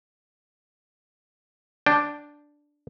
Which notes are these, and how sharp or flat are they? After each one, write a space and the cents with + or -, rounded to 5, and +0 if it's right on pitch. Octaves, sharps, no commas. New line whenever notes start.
D4 +0 G5 +0